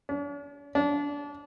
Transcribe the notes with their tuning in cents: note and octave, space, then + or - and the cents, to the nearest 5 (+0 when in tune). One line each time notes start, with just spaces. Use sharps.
D4 -45
D4 -25